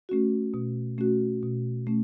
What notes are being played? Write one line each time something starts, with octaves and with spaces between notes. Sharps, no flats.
A3 C#4 F#4
B2
A3 C#4 F#4
B2
A3 C#4